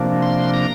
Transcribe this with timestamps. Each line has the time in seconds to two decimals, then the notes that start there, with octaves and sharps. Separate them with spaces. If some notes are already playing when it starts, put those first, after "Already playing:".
Already playing: C3 F3 A#3 D4
0.22 C6
0.54 A#5